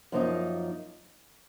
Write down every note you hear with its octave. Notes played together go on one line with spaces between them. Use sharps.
F#2 F3 A#3 D#4